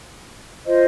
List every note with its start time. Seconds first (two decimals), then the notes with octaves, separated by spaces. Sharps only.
0.64 F4 C5 D#5